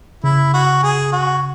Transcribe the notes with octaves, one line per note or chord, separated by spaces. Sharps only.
C#3 E4
F#4
G#4
F#4